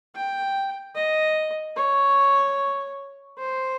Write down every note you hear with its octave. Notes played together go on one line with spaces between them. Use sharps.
G5
D#5
C#5
C5